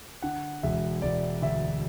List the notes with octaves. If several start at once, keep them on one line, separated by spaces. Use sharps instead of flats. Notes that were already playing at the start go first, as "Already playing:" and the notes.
D3 F#5
E1 E5
E1 D5
D2 E5